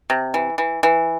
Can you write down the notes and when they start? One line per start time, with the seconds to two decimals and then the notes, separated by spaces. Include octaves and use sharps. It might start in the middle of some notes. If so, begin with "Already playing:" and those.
0.10 C3
0.34 E3
0.58 E3
0.83 E3